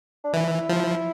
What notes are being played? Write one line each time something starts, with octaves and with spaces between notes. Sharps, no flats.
D4
E3 E4
F3